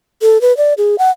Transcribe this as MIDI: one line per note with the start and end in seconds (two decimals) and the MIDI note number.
0.22 0.41 69
0.41 0.55 71
0.57 0.74 74
0.78 0.96 68
0.99 1.11 78